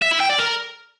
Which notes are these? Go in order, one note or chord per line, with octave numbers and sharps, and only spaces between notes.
E5
E4
G5
D5
A#4